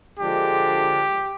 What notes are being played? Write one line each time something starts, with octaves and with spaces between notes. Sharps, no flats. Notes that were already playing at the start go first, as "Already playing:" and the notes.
D3 F3 G#3 D4 G4